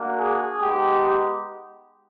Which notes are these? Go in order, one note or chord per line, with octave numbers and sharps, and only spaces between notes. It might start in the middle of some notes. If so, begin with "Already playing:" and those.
Already playing: A#3 D4 F#4
G#4
G#3 B3 D#4 G4